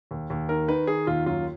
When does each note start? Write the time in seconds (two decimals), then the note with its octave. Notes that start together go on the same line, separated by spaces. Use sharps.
0.11 D#2
0.30 D#2
0.49 D#3 A#4
0.68 D#3 B4
0.87 D#3 G#4
1.07 D#2 F4
1.26 F#2 F4